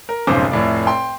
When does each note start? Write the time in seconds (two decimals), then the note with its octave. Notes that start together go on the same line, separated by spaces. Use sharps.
0.09 A#4
0.27 F1 B1 G#2 C#3 C5 D6
0.51 F1 A2 D5
0.87 G5 C6